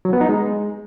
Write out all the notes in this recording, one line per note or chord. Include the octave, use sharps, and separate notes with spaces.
F#3
B3
D#4
G#3